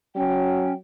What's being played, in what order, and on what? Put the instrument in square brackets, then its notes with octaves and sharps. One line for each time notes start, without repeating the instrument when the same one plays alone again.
[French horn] F#3 [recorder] C#4 [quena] G5